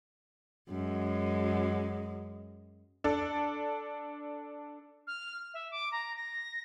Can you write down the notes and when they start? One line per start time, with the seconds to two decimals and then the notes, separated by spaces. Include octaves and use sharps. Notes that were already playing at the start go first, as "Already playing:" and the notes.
0.69 F#2 G#3
3.04 D4 A4
5.07 F6
5.54 E5
5.71 D6
5.92 A#5
6.16 A#6